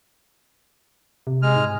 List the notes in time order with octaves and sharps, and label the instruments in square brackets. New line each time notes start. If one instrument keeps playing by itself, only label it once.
[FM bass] C3
[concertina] G#3 F6
[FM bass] G#2